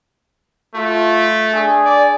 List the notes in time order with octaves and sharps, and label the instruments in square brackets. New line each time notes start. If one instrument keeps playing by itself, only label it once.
[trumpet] A3 [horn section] F4
[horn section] D4 G#4
[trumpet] D5